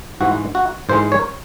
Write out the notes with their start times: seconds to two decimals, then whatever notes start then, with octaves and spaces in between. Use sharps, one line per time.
0.21 G#2 E3 G#3 F#4
0.55 F#4
0.89 G#2 E3 G#3 C5
1.12 C#5